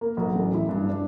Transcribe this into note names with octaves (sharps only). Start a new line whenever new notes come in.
A#3
B1
A1
E4
G2
D4